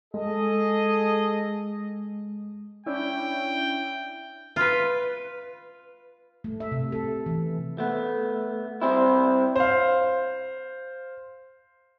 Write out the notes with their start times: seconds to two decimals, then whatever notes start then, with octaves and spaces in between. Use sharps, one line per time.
0.14 G#3 G#4 A4 D#5
2.86 C#4 D4 E4 G5
4.56 F4 B4
6.44 A3
6.60 E5
6.72 C3
6.92 A4
7.26 E3
7.78 A3 B3
8.82 G3 C4 E4
9.56 C5 F5